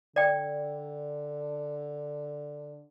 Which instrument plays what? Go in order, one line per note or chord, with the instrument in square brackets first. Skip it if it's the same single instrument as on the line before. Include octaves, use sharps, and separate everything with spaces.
[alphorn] D3 [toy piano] D5 G5